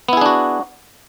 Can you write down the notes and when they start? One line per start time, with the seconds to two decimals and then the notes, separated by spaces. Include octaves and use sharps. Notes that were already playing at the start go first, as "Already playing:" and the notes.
0.09 B3
0.13 E4
0.17 G#4
0.21 D4
0.26 F#4